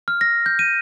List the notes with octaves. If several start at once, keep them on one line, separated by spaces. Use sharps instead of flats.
F6
A#6
G6
D#7